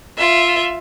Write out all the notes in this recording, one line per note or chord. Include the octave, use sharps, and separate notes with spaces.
F4 E5